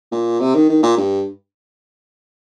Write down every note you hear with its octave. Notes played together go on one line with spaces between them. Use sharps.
A#2
C3
D#3
D#3
A#2
G2